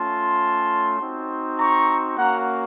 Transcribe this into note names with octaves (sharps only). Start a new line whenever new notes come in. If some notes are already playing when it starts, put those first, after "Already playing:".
Already playing: A3 C#4 F4 A5 C6
C4 D#4 F#4
A#5 C#6
A#3 C#4 F#4 F#5 A#5